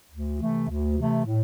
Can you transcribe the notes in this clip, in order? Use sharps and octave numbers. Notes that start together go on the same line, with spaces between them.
D2
C3 E3 A3
D2
C3 E3 A3
A2